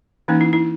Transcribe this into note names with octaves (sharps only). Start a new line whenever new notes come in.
E3 A#3 C#4 D#4
E4
E4